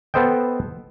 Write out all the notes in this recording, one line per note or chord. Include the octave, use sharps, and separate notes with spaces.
B3 A4 C5 D#5 G5